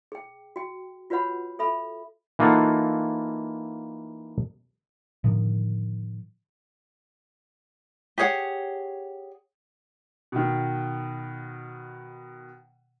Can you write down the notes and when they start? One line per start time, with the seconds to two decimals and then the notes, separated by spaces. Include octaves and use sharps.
0.12 G#4 G5
0.56 F#4 G5
1.10 F4 F#4 B4 C#5 F#5 B5
1.59 A4 E5 B5
2.39 E3 A#3 D#4 F4 A4 F#5
5.24 A2 D3 D#3 F3
8.18 G4 G#4 C#5 F#5
10.32 B2 D#3